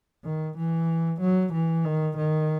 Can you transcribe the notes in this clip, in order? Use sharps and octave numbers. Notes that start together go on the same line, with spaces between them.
D#3
E3
F#3
E3
D#3
D#3